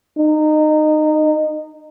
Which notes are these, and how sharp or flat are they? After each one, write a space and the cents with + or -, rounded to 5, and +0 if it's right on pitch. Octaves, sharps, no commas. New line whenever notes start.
D#4 -20